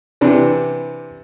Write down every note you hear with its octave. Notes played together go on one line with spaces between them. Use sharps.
C3 E3 D4 G4 B4